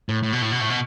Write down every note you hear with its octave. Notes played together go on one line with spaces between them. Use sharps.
A2
A2
B2
A2
B2
A2
B2